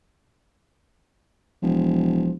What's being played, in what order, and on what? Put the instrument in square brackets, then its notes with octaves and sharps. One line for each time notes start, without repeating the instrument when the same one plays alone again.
[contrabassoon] E1 [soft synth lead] F3